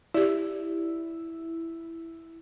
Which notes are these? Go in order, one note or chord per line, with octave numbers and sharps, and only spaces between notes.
E4 G4 D5